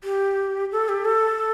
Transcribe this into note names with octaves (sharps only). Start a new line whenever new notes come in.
G4
A4
G4
A4